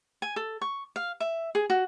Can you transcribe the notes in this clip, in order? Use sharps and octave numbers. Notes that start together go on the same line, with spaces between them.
G#5
A4
C#6
F5
E5
G#4
F#4